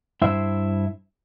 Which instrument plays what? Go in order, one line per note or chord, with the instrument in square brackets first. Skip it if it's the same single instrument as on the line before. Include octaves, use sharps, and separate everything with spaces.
[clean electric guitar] G2 E4 C5 E5